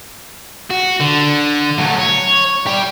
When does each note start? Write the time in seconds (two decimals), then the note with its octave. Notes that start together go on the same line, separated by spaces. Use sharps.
0.70 F#4
1.00 D3
1.78 F#3 A3
1.99 C#5
2.67 G4 D5